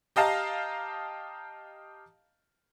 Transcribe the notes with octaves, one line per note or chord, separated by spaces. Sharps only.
G4 D#5 F5 A5 A#5